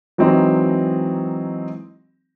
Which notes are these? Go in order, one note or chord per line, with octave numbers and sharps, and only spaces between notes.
E3 F#3 G#3 C4 D#4